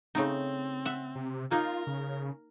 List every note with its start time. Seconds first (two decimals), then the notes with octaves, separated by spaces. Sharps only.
0.15 C#3 A3 C4 D#4
0.85 E5 F#5
1.15 C3
1.51 A#3 D#4 F4 A#4
1.87 C#3